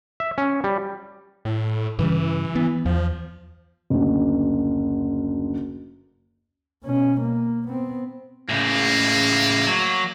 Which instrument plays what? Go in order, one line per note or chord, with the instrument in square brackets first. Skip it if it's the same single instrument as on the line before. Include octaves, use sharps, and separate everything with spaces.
[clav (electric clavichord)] E5
C#4
G3
[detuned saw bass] A2
[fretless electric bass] G2 C#3 G3 [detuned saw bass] E3
[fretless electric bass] B3
[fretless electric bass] E2 [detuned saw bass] F3
[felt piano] F#1 D2
[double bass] B2 C#4
A#3
B3 C4
[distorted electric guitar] A2 C#3 [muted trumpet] A#3
[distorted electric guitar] F#3